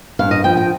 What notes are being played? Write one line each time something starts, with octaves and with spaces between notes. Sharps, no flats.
G2 F5
D#5
F3 G5
G5